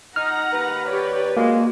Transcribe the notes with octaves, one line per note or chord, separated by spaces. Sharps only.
D#4 F#5 A#5 F6
D#2 B4
G4 C#5 D5
G#3 A#3 F#4